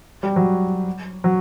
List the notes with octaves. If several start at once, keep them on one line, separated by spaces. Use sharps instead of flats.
G3
F#3
F#3